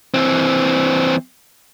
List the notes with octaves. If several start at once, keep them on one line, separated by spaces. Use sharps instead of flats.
E3 C4